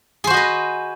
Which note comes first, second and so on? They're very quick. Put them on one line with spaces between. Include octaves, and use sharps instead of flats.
G#4 C5 F#4 D#5 B4